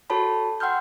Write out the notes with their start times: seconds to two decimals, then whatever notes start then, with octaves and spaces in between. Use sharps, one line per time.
0.10 F#4 A4 C#5 A5 B5
0.60 F#5 G5 C6 E6 F6 G6